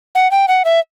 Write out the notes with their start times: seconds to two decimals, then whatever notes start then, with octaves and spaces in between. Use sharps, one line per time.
0.15 F#5
0.31 G5
0.48 F#5
0.65 E5